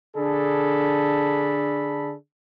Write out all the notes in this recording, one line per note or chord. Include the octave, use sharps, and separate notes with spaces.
D3 D4 G#4 A4 B5